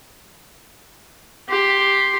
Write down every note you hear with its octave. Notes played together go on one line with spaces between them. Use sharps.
G4 C6